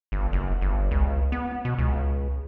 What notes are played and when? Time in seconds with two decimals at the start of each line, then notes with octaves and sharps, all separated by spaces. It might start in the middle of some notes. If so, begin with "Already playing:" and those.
0.12 G1
0.33 F#1
0.61 G1
0.91 C#2
1.32 B3
1.65 B2
1.79 C#2